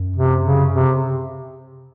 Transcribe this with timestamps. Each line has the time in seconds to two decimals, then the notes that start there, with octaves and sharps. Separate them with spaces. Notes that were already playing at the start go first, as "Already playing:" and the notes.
Already playing: F#2
0.16 C3
0.45 C#3
0.72 C3